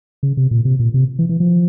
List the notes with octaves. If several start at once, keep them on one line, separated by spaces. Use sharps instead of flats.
C#3
C3
A#2
C3
A#2
C3
E3
E3
F3